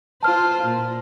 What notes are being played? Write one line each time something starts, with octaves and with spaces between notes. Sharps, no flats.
F4 C5 A5 F6
A#2